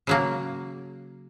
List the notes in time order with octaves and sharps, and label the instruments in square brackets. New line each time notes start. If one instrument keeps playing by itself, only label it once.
[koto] C#3 F#3 A#3